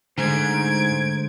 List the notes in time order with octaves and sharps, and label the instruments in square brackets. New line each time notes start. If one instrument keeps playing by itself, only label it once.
[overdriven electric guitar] G#2 [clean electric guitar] D3 G#3 A3 [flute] C5 [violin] G#6 D7